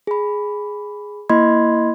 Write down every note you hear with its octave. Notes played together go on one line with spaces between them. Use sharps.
G#4 B5
A#3 E4 D#5 B5 C6 G#6